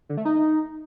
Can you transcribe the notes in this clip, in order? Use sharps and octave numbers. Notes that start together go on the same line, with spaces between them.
D3
A3
D#4